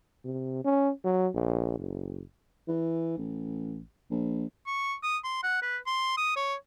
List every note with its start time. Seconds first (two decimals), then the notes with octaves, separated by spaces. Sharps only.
0.25 C3
0.65 C#4
1.04 F#3
1.34 A#1
1.79 F#1
2.68 E3
3.17 A1
4.10 A#1
4.66 C#6
5.03 D#6
5.24 C6
5.43 F#5
5.62 B4
5.86 C6
6.17 D#6
6.36 C#5